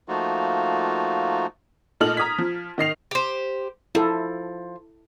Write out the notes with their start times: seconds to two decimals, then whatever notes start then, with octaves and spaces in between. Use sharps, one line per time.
0.08 F3 A3 A#3 D#4 F4 F#4
2.00 A#2 A3 D#4 A4 F6 F#7
2.17 A#5 D#6 G#6 B6
2.39 F3
2.78 D#3 D#5 C7 F7
3.11 G4 C5
3.95 F3 E4 A4